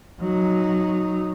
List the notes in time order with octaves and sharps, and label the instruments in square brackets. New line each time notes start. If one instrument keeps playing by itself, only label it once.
[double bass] F#3 D#4